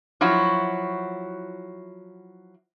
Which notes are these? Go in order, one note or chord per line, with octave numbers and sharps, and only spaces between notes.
F3 F#3 E4 F#4